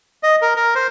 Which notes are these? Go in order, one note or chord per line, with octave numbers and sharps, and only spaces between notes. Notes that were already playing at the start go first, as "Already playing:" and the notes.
D#5
A#4
A#4
C5